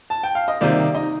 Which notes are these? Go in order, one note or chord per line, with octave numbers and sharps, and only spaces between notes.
A5
G5
F5
D#5
C3 D#3 G3 A#3 D5
D#4 D#5